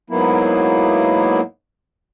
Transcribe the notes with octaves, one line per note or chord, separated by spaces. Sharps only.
G#2 F#3 A#3 B3 E4